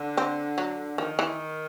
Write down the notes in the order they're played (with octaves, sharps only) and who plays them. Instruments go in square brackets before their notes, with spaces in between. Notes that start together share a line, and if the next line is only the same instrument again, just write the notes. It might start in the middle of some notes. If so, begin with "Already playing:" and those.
Already playing: [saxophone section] D3
[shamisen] C4
F#3
[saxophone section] D#3 [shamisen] F3
[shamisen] E3